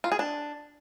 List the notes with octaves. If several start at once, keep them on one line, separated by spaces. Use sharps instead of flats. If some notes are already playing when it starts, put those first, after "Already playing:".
F4
G#4
D4